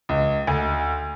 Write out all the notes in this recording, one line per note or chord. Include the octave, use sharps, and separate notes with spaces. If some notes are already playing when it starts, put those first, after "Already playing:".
C#2
D2